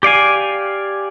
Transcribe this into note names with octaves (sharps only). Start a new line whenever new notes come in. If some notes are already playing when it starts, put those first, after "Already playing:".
G4 D5 F5 G#5